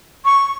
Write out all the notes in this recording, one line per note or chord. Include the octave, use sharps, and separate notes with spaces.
C#6